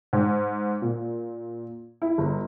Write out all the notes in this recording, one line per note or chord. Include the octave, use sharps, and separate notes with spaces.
G#2
A#2
E4
G1